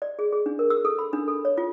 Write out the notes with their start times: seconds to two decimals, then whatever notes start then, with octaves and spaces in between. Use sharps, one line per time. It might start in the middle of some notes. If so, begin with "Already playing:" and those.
0.02 D5
0.19 G#4
0.32 G#4
0.46 D4
0.59 A#4
0.70 E6
0.85 A4
0.99 B5
1.13 D4
1.28 A4
1.45 C#5
1.57 F4